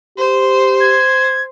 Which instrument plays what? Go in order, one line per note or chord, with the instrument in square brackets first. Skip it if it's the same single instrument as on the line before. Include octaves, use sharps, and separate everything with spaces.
[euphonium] G4 [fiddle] C5
[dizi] G#6